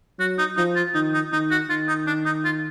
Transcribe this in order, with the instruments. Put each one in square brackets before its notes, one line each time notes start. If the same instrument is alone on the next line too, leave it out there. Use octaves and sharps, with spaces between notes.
[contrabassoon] F#3 [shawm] F#4
[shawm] D#4
[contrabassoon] F3 [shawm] D#4
[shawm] F4
[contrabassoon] D#3 [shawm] D#4
[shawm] D#4
[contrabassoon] D#3 [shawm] D#4
[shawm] F#4
[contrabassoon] D#3 [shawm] F4
[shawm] D#4
D4
D#4
F4